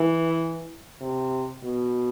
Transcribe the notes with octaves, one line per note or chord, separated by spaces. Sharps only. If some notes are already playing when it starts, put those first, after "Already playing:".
Already playing: E3
C3
B2